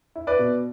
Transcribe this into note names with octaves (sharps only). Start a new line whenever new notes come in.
E4
B4 D5
B2